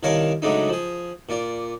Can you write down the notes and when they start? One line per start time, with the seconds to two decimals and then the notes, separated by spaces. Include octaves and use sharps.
0.03 C2 D#3 A#4 C#5 F5 A5
0.42 C#3 F#3 G#3 A3 D4 D#4
0.69 F3 G#4
1.29 A#2 F4 D5